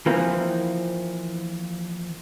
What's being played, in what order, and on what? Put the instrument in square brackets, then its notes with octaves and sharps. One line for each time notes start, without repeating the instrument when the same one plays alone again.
[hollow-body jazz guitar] E3 F3 A#3 C4